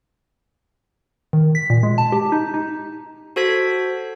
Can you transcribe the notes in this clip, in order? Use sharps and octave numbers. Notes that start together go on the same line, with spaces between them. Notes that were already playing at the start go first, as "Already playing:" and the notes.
D#3
B6
A#2
G#3
A5
G4
D#4
D#4
F#4 A4 C5 G#6 B6